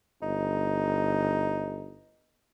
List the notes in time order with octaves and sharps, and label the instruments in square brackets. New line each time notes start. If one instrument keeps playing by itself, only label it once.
[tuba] G1 [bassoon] D#4